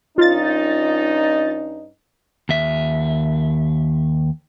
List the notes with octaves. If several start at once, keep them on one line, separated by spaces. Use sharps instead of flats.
G2 C#4 D#4 F4 A6
D#2 E5